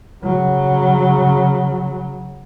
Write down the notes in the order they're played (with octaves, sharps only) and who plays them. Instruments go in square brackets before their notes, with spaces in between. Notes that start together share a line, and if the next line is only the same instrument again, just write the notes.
[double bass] C#3 F#3